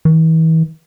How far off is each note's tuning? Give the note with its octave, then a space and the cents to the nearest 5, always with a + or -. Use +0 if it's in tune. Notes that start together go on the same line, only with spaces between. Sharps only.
E3 -40